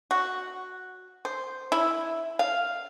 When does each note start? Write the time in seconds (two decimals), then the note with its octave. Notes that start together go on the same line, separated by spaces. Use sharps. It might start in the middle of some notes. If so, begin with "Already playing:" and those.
0.11 F#4
1.25 C5
1.72 E4
2.39 F5